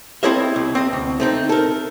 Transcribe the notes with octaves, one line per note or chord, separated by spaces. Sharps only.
C4 E4 A4 C#5 D#5 E5
C2
C4 D#5
D2
A3 C4 D#4
A4 A#4